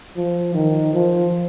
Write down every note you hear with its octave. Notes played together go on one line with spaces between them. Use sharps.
F3
D#3
F3